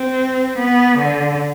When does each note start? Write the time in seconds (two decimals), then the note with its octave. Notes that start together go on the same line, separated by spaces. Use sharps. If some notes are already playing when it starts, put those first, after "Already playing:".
Already playing: C4
0.58 B3
0.98 D3